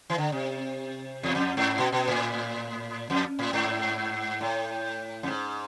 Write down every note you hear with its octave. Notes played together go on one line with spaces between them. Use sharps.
E3
D3
C3
E2
F2
G#2
B2
B2
A2
F2
A2
G#2
A2
F2
G#2